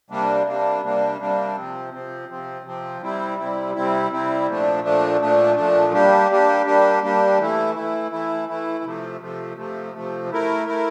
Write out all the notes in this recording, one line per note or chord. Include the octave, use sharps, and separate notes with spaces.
C3 G3 A#3 D4
C3 G3 A#3 D4
C3 G3 A#3 D4
C3 G3 A#3 D4
C3 F3 C4
C3 F3 C4
C3 F3 C4
C3 F3 C4
C3 G3 C4 E4
C3 G3 C4 E4
C3 G3 C4 E4
C3 G3 C4 E4
A#2 F3 A3 D4
A#2 F3 A3 D4
A#2 F3 A3 D4
A#2 F3 A3 D4
G3 A#3 D4 G4
G3 A#3 D4 G4
G3 A#3 D4 G4
G3 A#3 D4 G4
E3 A3 E4
E3 A3 E4
E3 A3 E4
E3 A3 E4
C3 F3 A3
C3 F3 A3
C3 F3 A3
C3 F3 A3
A3 E4 A#4
A3 E4 A#4